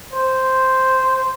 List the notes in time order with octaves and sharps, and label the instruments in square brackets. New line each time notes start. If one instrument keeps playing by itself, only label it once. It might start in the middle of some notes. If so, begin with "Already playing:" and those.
[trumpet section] C5